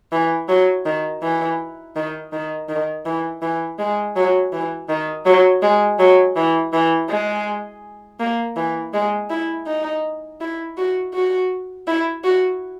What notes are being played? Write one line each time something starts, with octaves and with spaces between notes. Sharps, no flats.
E3
F#3
D#3
E3
D#3
D#3
D#3
E3
E3
G#3
F#3
E3
D#3
F#3
G#3
F#3
E3
E3
G#3
A#3
E3
G#3
E4
D#4
E4
F#4
F#4
E4
F#4